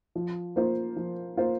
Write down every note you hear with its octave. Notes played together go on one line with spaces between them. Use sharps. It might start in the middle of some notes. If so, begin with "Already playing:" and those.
F3
A#3 F4 C5
F3
A#3 F4 C5